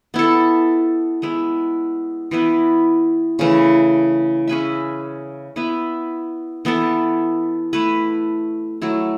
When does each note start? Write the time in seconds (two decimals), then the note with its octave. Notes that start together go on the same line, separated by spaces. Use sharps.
0.14 B3 E4 A4
1.22 G#3 B3 E4
2.31 E3 B3 E4 B4
3.39 C#3 E3 A3
4.48 C#4 G#4 B4 E5
5.56 B3 E4 B4 E5
6.65 E3 B3 E4 A4
7.73 A3 E4 B4
8.81 F#3 A3 E4